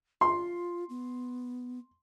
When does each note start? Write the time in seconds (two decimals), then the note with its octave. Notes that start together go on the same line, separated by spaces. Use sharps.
0.21 F4 C6
0.89 B3